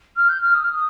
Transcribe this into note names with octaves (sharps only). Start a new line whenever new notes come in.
F6
G6
F6
D#6
F6
D#6